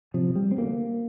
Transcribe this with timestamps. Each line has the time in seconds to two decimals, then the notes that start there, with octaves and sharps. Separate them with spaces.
0.14 C3 F3
0.36 G3
0.51 C4
0.57 D2 A#3